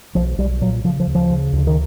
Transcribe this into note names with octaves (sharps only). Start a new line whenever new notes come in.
B1 F3
B1 G3
A#2 F#3
C#3 F3
F3
D2
F3
C#3
D2 D3
D#3